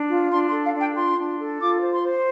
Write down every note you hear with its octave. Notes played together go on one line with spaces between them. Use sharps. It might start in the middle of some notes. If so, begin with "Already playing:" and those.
Already playing: D4
F4
D4 C6
C6
A4
F5
D4 G5
F4 C6
D4
A4
F4 D6
C5
C6
C5